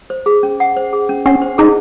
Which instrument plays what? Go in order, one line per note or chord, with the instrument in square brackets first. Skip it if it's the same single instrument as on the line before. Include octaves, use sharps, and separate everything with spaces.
[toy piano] C5
G#4
C#4
F#5
C5
G#4
C#4
[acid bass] C#4 [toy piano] F#5
[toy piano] C5
[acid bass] D#4 [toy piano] G#4